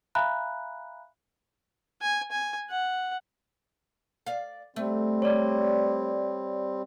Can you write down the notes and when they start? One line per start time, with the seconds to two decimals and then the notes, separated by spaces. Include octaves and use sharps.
0.15 E5 F5 G#5 A#5 B5 F#6
2.02 G#5
2.31 G#5
2.70 F#5
4.27 D5 F5
4.76 G3 A3 C4
5.22 C#5 D5